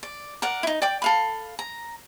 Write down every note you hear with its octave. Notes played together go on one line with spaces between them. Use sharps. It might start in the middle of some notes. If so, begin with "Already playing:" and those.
D5
A#4 D5 F#5
D#4 E4
D5 G5 D6
A4 F5 B5
A#5